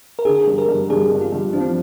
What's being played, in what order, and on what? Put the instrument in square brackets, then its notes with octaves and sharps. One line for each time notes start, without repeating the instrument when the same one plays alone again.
[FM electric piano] A#4
[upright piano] D3 [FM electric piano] G#4
[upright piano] G2
[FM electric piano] A#4
[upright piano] G2
[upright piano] G2 [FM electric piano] G#4
[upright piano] G2
[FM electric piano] F4
[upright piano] G2
[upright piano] F3 [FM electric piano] D4
[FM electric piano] C4